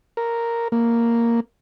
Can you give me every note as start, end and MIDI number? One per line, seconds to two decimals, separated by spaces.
0.17 0.68 70
0.72 1.40 58